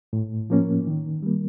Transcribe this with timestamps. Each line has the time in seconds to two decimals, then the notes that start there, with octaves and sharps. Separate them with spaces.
0.13 A2
0.50 F3 A#3 C#4
0.87 D#3
1.23 G3 A#3